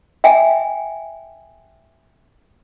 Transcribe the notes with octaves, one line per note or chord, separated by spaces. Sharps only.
E5 G5 G#5